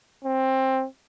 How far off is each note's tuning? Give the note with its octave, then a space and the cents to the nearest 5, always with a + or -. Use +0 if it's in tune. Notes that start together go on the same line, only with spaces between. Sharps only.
C4 +15